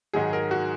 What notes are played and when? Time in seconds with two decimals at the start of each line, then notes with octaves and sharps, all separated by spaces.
0.13 G#2 D#3 F#3 G#4
0.33 A#4
0.51 F#4